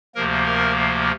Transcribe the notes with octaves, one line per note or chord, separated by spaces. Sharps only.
D2 C3 F3 A#3 A#4
A#4